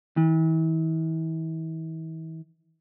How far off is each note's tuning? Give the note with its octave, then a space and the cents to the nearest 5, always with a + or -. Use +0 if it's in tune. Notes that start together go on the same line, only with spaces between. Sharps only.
E3 -40